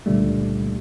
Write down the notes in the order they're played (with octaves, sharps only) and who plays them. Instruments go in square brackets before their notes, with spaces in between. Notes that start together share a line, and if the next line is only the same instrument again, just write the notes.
[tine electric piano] C#2 A#2 D3 G3 A3